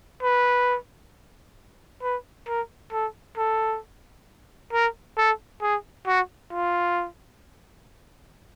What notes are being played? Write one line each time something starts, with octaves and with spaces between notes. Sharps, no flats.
B4
B4
A#4
A4
A4
A#4
A4
G#4
F#4
F4